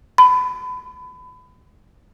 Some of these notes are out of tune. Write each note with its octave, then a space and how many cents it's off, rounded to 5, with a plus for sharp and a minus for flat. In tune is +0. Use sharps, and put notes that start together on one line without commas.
B5 +30